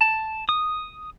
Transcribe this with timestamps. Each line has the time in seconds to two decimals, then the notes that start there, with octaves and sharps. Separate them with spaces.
0.01 A5
0.49 D#6